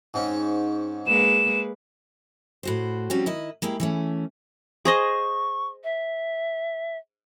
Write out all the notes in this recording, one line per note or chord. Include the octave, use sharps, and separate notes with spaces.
G#2 C4 C#4
G#3 A#3 B4 E7
A2 F#4 C5
F3 G3 C4 C#4 F#4
D#3 E4 D#5
G#3 A#3 E4 G4
E3 A3 C#4
G#4 C5 D#5 C#6
E5